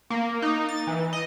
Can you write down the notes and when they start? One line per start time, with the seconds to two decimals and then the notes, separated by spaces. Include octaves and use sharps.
0.10 A#3
0.42 D#4
0.69 A6
0.87 E3
1.13 D#5